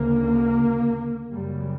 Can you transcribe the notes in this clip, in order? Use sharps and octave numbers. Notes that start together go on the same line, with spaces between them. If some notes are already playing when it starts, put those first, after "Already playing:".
Already playing: D2 C#3 A#3
F#2 C#3 G3